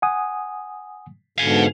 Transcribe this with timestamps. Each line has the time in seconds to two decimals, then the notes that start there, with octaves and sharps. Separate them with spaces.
0.02 F#5 G#5 D#6
1.38 G#2 B2 D3 F5 G#5